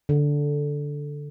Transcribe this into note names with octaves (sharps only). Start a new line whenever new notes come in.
D3